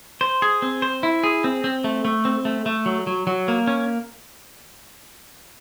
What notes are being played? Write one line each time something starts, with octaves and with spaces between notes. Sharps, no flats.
C5
G#4
C4
C5
E4
G#4
C4
C4
A3
A3
C4
A3
A3
F#3
F#3
F#3
A#3
C#4